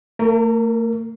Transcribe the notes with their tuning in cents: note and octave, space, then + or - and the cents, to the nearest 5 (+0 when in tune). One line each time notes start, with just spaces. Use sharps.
A3 +45 A#4 +0